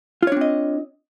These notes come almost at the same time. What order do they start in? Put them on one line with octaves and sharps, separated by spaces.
F4 C#5 D4 C4 D#5